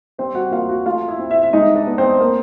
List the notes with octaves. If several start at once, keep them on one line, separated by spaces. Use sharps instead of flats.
G3 C4 C5
F#4 F#5
A#3 F4 F5
F#4 F#5
A3 F4 F5
E4 E5
C4
E4 E5
E5
G#3 D#4 D#5
D4 D5
B3
C4 C5
A#3